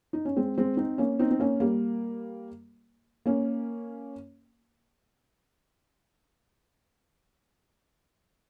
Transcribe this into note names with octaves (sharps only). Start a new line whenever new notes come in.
D#4
C#4
G#3 C4
G#3 C4
C4 D#4
A#3 C#4
C4 D#4
C4
A#3 C#4
G3 A#3
A#3 C#4